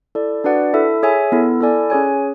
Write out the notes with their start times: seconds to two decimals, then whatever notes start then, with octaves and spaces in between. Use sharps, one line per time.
0.15 E4 A4 D5
0.44 D4 F#4 B4 D5 F#5
0.74 E4 A4 E5
1.03 G#4 C#5 E5 G#5
1.32 B3 E4 A4
1.61 E4 A4 D5 G#5
1.90 C#4 G#4 C#5 G#5